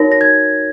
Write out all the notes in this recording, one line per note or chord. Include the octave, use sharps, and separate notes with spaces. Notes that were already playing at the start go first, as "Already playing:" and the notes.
Already playing: D#4 F#4 A#4 C#5 A#6
A#6
G#6